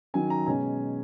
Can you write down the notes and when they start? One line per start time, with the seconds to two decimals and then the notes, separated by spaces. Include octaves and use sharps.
0.14 D#3 F#3 C#4 G#5
0.30 A#5
0.46 B2 G#3 C#4 G#5